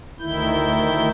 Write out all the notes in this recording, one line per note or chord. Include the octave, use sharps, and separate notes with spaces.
D2 D#3 E4 G6